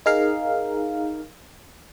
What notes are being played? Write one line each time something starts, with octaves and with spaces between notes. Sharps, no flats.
D#4 G#4 A#4 F5